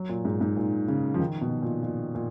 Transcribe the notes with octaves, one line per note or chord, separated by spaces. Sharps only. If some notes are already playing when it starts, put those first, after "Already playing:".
Already playing: F#3
A#2
G#2
G#2
A#2
C#3
F3
D#3
B2
A#2
A#2
A#2